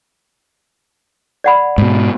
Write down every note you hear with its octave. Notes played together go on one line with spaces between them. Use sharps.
D5 F#5 B5
G#2 B2